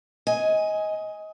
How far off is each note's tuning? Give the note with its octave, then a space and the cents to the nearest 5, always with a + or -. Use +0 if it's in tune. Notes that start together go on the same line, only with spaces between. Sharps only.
D#5 +20 G#5 +0